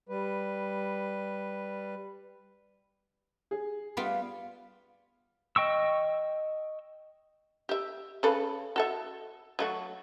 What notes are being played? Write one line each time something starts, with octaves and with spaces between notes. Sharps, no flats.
G3 B4
G#4
G3 B3 F4
D#5 G5 C#6 E6
G4 E5
C#3 A4 B4
F#4 A4 E5
F#3 A3 F#4